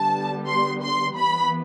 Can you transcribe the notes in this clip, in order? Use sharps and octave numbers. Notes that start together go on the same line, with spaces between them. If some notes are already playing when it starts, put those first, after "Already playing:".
Already playing: D3 G3 B3 A5
C6
C6
E3 B3 B5